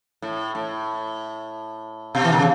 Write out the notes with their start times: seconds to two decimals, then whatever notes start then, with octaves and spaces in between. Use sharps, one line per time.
0.22 A2
0.55 A2
2.15 B2
2.24 E3
2.33 D#3
2.39 C#3